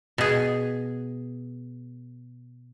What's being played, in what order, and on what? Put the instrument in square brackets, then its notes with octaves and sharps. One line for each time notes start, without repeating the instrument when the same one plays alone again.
[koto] B2 G#4